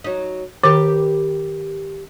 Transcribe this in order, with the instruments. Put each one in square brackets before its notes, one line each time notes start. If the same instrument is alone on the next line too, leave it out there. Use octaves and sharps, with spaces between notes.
[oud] F#3 D#4
[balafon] D#3 [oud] G4 A#4 B4